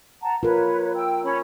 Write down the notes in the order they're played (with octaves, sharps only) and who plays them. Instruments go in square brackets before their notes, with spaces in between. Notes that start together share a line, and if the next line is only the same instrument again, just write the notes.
[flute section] F#5 A5 A#5
[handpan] F4 A#4 [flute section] B4 C#5
[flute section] G5 E6
C#4 C#5 B5